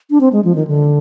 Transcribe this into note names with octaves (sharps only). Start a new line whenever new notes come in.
D4
C4
G#3
F3
D#3
D3